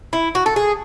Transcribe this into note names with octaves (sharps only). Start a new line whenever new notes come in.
E4
F#4
A4
G#4